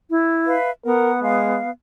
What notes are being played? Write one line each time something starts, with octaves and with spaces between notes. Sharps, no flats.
E4
B4 E5 F5
B3 A#4 F#5
G#3 F5